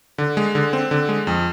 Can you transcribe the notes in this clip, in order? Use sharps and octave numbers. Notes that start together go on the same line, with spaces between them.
D3
G#3
D3
C4
D3
G#3
F2